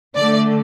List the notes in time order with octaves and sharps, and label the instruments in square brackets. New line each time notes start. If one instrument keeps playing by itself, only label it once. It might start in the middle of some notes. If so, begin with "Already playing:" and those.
[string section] D3 A3 D5